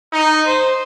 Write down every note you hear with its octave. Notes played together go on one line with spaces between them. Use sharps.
D#4
C5